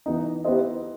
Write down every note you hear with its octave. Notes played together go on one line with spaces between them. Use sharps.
E3 B3 D#4
B3 E4 G4 C5 D#5